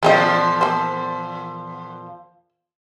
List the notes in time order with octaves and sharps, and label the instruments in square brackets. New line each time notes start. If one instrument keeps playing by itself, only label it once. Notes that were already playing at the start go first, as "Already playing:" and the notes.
[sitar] E2 A#2 F3 [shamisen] C#3 G4 D#5
[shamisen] A#3 C5